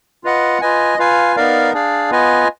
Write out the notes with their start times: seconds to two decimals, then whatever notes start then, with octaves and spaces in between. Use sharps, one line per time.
0.24 F4 B4 D#5 F#5
0.61 F4 B4 D#5 G#5
0.98 F4 B4 F5 G#5
1.36 B3 D#4 A#4 D5 F5
1.73 D4 G#4 D5 F5
2.10 B3 F4 B4 D#5 G#5